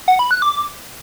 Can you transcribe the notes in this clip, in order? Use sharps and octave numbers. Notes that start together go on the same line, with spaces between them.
F#5
B5
F#6
D6